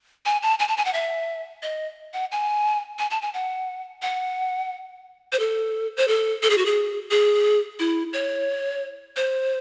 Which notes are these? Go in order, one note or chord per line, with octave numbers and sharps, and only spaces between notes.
G#5
A5
G#5
A5
G#5
F#5
E5
D#5
F#5
G#5
G#5
A5
G#5
F#5
F#5
C5
A4
C5
A4
A4
G#4
F#4
G#4
G#4
E4
C#5
C5